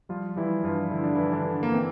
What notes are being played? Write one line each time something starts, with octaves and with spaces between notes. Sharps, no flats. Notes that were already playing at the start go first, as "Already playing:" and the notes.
F3 G3 F4
E3 G3 E4
G2 F3 F4
D3 E4
D4
G2 E3 E4
D3 D4
D3
A#3
E3 C4